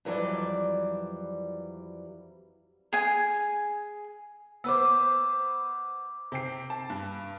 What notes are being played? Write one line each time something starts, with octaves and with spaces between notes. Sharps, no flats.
F2 E3 F#3 G3 D5
G#4 G#5
B3 B4 C5 D6 E6
C3 G5 C7
A5
G2